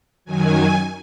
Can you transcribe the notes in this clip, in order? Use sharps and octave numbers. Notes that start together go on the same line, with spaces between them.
F#2 D#3 F#3 G#5